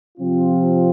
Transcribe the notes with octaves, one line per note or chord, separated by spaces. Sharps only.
C3 F3 C4 F4